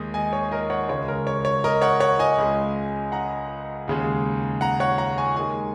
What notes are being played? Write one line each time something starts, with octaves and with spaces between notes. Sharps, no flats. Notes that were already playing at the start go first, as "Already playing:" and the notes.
Already playing: D#2 D#3 G#3 D#6
D#5 G#5
C#5
A#4 D#5
C#5 F#5
C#2 C#3 G#3 C#5
A#4
C#5
C#5
A#4 D#5
C#5 F#5
C#5 F#5
D#5 G#5
C#2 C#3 G#3
F#5 A#5
D#2 C#3 G#3
F#5 A#5
C#5 F#5
F#5 A#5
G#5 C#6
D#2 D#3 G#3 G#5 C#6